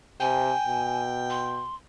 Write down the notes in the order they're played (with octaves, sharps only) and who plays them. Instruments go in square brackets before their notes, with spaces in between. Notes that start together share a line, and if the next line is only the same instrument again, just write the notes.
[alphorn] C3 [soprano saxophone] G5 [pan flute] G#5
[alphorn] B2
[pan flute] C6